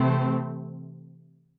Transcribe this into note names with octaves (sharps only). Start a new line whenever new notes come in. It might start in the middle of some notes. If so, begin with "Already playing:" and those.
Already playing: C3 E3 A3 C4